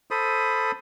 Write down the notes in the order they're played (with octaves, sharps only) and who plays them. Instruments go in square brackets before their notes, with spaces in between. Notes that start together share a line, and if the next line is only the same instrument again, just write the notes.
[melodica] A4 C5 B5 D#6